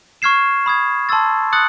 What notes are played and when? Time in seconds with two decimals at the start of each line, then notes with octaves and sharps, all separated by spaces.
0.22 C#6 F6 G#6 C7 E7
0.66 B5 D#6 G#6
1.09 A5 C6 E6 A6
1.53 D#6 F#6 A6 C#7 F#7